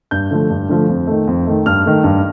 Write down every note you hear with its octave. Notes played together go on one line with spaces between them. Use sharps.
G2 G6
D3 F3 A3
G2
D3 F3 A3
F2
D#3 A3
F2
D#3 A3
G2 F6
D#3 A3
G2